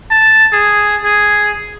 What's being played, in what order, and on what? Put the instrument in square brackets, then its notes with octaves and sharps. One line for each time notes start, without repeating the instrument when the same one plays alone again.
[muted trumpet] A5
G#4
G#4